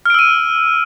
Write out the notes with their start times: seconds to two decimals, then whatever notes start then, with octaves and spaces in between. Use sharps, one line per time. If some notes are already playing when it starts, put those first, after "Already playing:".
0.06 F6
0.10 D7
0.14 E6
0.19 D#7